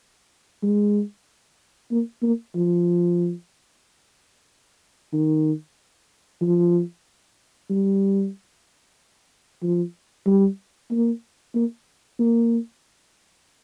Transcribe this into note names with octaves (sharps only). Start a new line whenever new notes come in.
G#3
A#3
A#3
F3
D#3
F3
G3
F3
G3
A#3
A#3
A#3